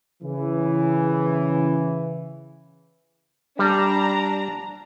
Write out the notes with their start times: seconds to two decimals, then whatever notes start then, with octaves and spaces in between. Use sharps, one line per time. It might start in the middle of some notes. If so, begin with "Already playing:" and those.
0.23 C#3 E3
3.59 G3 D4 A#5